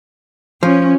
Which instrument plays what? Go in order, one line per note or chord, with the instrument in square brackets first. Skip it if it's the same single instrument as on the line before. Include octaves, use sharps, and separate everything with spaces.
[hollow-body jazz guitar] F3 [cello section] C#4